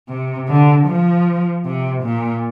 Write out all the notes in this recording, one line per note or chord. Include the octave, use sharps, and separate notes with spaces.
C3
D3
F3
C3
A#2